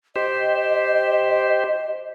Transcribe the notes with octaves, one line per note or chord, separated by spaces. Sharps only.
G4 C5 D#5